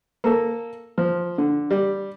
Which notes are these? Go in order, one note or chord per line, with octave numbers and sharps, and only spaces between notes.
A#3 A4
F3
D3
G3